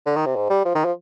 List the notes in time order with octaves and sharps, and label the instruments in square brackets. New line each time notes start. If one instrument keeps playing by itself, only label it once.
[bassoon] D3
D#3
C3
G#2
G3
F3
D#3
F3